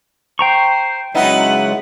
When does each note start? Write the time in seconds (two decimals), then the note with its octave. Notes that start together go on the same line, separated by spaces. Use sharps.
0.39 C5 G5 A#5 C#6
1.15 C#3 F#3 G#3 B3 D#4 E4 F#5